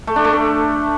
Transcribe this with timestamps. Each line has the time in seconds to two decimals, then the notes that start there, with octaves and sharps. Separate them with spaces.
0.07 A3
0.16 D4
0.25 A3
0.33 D4